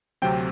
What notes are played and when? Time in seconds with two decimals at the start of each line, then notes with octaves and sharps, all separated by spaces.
0.22 D2 C3 F#3 C4 G5